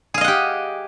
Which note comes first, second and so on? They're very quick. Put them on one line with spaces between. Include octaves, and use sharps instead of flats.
G#4 F5 D#5 F#5 G4